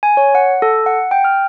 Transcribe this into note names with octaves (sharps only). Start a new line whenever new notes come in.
G#5
C#5
F#5
A4
F#5
G5
F6